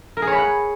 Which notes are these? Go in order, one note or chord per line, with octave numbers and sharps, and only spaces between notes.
A#4
G#4
C#5
B5
F#5